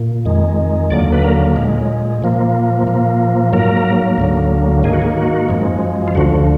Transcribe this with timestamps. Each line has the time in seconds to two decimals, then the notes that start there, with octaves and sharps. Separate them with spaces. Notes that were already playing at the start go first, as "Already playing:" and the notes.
Already playing: A#2
0.25 F2 D#3 G#3
0.90 D#2 D3 F#3 A#3 D5
1.12 B4
1.24 A#4
1.56 A#2 G#3
2.22 A#2 F3 A#3
2.87 A#2 F3 A#3
3.53 G#2 F#3 A#3 A#4
4.18 D2 D3 F#3 A#3
4.83 G#2 D#3 A#3 G#4
4.93 F#4
5.02 G#4
5.17 F#4
5.49 F#2 F3 G#3
6.08 F4
6.15 D2 D3 F3 F#4